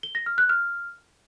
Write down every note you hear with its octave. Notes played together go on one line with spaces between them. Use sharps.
G7
A#6
F6
F#6
F6